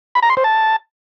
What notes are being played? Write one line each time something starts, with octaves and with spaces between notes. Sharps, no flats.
B5
A#5
C6
C5
A5